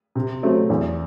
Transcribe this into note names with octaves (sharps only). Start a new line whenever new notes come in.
C3
F#3 A3 C4
E2